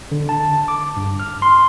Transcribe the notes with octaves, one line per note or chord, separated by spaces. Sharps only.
D3
A5
D6
G2
F6
C6